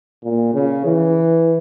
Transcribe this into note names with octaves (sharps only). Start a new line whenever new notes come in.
A#2
C#3
E3